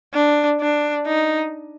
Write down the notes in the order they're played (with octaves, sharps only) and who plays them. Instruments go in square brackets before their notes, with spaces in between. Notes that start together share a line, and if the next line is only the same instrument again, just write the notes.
[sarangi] D4
D4
D#4